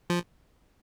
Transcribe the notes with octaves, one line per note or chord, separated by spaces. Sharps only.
F3